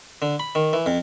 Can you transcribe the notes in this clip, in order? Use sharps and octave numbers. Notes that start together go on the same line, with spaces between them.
D3
B5
D#3
E3
F2